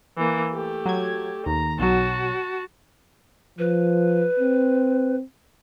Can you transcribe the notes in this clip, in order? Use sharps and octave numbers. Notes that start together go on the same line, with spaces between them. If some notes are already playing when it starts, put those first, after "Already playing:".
E3 A#3
A3 G4
F#3 G#6
D#2 A#5
B1 F#3 F#4 A5
F3 B4
C4